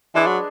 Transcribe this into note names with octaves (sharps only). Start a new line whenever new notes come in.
E3 G#3 D4 G#4 B4
F#3